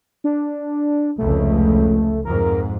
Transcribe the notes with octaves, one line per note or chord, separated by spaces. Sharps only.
D4
F1 C#2 A3
F2 G#2 A#4